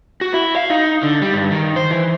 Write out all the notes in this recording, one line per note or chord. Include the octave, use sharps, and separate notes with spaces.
F#4
E4
F5
D#4
D3
G3
G2
D#3
C5
E3